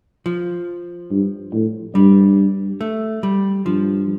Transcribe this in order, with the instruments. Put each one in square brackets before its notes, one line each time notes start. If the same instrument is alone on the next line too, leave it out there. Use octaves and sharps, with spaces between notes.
[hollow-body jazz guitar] F3
[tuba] G2
A2
[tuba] G2 [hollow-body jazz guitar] G3
[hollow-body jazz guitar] A3
G3
[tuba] G2 [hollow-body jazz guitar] F3